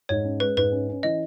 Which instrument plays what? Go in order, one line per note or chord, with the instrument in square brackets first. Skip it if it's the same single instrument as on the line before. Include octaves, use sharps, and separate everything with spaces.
[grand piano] G#2 [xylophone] C#5
[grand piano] C#4
[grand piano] G#3 [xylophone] B4
[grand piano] G#2 [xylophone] B4
[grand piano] C#4
C#4
[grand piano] E3 [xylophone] D#5